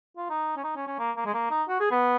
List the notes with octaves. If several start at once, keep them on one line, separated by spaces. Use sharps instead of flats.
F4
D#4
C#4
D#4
C#4
C#4
A#3
A#3
G#3
A#3
D#4
F#4
G#4
B3